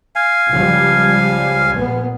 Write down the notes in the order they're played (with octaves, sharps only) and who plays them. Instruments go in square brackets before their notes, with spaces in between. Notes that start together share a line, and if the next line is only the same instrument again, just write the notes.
[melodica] F5 G#5
[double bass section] C#2 F3 G3
A#1 A#2 B3